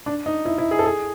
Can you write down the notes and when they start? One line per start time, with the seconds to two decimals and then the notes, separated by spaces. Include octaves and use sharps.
0.06 D4
0.26 D#4
0.45 E4
0.58 E4
0.71 G#4
0.79 A4
0.85 G#4